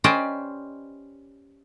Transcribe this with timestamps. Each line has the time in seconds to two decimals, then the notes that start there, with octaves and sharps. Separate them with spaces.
0.04 C#4 G4 B4 C5 D5 D#5